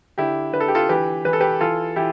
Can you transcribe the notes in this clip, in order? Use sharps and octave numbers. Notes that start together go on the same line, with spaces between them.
D3 E4 G4
D3 B4
A4
G4
F4 A4
E3 G4 B4
E3 B4
A4
G4 B4
E3 F4 A4
E3 E4 G4